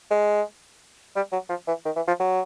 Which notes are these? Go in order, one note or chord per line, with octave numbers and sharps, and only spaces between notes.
G#3
G3
F#3
F3
E3
D#3
E3
F3
F#3